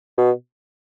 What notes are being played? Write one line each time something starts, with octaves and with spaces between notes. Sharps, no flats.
B2